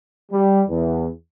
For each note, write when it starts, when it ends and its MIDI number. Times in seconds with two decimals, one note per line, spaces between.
0.32 0.62 55
0.69 1.07 40